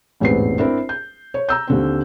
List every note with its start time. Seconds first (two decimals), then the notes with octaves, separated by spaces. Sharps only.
0.20 E1 A1 G#2 B3 C4 C7
0.58 C4 D4 E4 A#4
0.89 G6
1.34 C#5
1.49 A#5 E6 G6
1.68 D#2 D3 C4